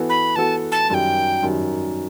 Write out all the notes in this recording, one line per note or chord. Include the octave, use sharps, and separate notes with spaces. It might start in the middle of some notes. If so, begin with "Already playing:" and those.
Already playing: E3 B3 F#4 A4
B5
E3 B3 F#4 A4 A5
A5
F#2 D#3 G3 G5 A5
F#2 D#3 G3